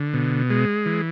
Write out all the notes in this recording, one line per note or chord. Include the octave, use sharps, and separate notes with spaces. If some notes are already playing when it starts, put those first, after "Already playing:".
Already playing: D3
B2
G#3
E3